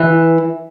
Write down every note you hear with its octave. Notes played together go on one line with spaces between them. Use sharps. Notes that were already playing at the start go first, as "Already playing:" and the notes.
Already playing: E3